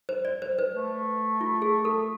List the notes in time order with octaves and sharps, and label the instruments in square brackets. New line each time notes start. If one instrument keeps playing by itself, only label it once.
[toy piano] C5
D5
C5
B4
[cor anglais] A3
[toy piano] F4
G#4
A4